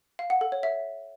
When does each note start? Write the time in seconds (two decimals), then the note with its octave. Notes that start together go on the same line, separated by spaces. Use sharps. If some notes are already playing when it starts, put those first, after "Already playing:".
0.19 F5
0.30 F#5
0.41 A4
0.52 C#5
0.63 E5